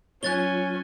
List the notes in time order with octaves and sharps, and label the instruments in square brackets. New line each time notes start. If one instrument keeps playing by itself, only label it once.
[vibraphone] F#3 F4 [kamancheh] C#4 G#5 [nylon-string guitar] C#5 [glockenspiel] F#6 A6 G7